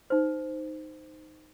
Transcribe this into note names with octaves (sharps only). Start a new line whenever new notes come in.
D#4 C5